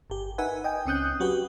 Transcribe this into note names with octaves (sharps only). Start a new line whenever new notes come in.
G1 G4
D#4 A#4 B4 E5 F#5 G#5
D#5 G5 G#5
C#2 C4 C#4 D#6 F#6 G6
F#3 F#4 G4 B4